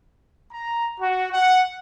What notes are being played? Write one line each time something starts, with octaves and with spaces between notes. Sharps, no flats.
A#5
F#4
F#5